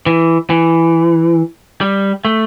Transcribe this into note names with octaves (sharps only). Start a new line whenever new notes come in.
E3
E3
G3
A3